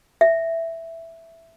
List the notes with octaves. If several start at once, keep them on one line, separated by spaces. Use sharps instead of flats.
E5